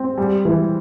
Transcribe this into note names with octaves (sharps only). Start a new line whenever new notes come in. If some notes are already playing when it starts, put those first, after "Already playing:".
Already playing: C4
G3
E3